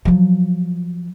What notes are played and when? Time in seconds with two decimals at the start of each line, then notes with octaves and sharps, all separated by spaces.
0.05 F3 F#3